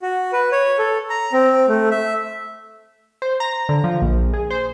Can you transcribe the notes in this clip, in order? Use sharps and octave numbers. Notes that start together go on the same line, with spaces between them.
F#4
B4
C#5
A4
A#5
C4
A3
E5
C5
A#5
D3
F3
A#1
G#4
C5